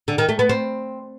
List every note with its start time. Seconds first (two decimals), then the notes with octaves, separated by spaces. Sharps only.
0.08 D3
0.18 D#3
0.29 A3
0.39 B3
0.49 C4